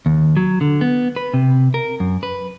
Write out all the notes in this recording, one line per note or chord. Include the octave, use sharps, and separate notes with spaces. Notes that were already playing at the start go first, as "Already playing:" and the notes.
D#2
F#3
D3
B3
B4
C3
A#4
F#2
B4